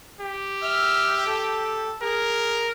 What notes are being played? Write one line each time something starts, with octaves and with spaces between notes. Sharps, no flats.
G4
E5 E6 F6
A4
G#4 A#4